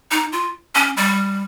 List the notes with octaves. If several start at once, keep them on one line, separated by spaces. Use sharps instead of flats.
D#4
F4
C#4
G3